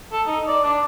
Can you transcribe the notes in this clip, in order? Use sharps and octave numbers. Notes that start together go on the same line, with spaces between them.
A4
D#4
D5
D4